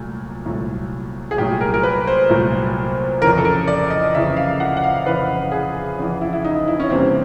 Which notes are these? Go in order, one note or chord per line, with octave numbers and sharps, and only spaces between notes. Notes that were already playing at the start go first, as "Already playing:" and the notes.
Already playing: C2 A#2 F#3 A3
C2 A#2 F#3 A3
G#4
C2 A#2 F#3 A3 G4
A#4
A#4
B4
C5
C2 A#2 F#3 A3
F2 C#3 E3 A#4
A4
A#4
D5
D#5
F2 C#3 E3 E5
F5
F#5
F#5
F5
F2 C#3 E3 B4
G#4
F2 C#3 E3
E4
E4
D#4
E4
C#4
E2 C3 E3 G3 A#3 C4